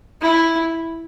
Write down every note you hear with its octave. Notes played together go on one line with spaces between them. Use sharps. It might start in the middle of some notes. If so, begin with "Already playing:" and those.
E4